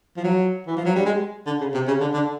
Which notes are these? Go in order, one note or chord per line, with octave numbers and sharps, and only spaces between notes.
F3
F#3
E3
F3
F#3
G3
G#3
D3
C#3
C3
C#3
D3
D3